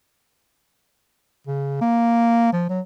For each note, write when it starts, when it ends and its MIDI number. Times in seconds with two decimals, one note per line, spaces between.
1.47 1.80 49
1.81 2.50 58
2.52 2.69 53
2.69 2.80 54